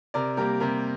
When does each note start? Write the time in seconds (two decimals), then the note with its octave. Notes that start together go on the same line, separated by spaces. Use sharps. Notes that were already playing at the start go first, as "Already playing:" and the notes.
0.14 C3 A#4 D5
0.37 G3 A#3 G4 A#4
0.60 C3 G4 A#4